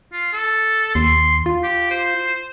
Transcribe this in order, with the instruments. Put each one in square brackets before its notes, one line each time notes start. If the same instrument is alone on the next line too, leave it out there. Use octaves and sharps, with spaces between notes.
[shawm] F4
A4
[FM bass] D#2 [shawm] C6
[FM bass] F4
[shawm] G4
C5